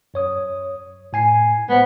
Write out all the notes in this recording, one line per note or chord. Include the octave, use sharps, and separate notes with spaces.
F#2 C#5 D#6
A2 G#5 C7
G#3 B3 C5